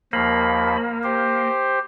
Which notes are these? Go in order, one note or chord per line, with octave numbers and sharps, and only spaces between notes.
D#2 F3 A#3 B5
G4 C5